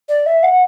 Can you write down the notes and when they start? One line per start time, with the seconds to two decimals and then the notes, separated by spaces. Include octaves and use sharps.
0.08 D5
0.26 E5
0.43 F#5